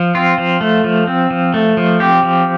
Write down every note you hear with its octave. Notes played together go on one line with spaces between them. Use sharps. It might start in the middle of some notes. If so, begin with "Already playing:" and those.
Already playing: F3
C4 F4
F3
A3
F3
C4
F3
A3
F3
C4 G4
F3